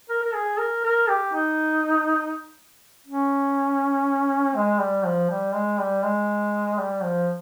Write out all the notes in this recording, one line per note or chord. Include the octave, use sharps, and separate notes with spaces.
A#4
A#4
G#4
A#4
A#4
G4
D#4
C#4
G#3
G3
F3
G3
G#3
G3
G#3
G3
F3